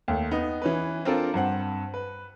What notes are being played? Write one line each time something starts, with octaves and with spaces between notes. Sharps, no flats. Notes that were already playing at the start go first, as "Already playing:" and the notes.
D#2 A3
B3 D#4
E3 C#4 B4
C4 D4 F4 A4 A#4
G2 C4 F#5
B4